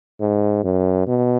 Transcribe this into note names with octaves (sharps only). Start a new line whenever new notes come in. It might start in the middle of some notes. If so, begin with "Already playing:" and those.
G#2
F#2
B2